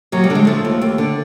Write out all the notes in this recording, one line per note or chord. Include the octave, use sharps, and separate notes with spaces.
D#2 F#3
G3
D3
G#3
F3 A3
D#2
D#2
D3